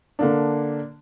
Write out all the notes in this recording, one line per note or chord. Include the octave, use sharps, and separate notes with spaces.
D3 A#3 D4